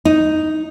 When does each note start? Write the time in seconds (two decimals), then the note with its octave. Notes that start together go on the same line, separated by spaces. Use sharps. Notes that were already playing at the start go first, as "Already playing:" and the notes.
0.05 D#4